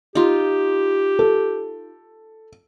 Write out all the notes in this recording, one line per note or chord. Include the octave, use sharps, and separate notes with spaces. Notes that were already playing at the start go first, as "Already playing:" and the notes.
D#4 F4 G4
A4